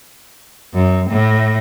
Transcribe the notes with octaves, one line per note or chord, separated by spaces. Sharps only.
F#2
A2